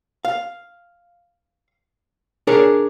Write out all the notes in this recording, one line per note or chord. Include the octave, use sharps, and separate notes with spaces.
F5
D4 G#4 A#4 C#5